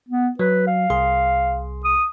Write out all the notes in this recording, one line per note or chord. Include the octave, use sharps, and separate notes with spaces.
B3
F#3 B4
F5
C2 G#4 C6
D#6